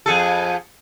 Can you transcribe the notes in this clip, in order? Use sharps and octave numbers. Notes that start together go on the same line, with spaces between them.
F2 G#4 A4